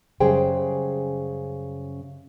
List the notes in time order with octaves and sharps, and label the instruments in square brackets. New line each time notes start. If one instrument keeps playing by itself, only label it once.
[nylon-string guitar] F#2 C#3 G3 G#4 C5 G5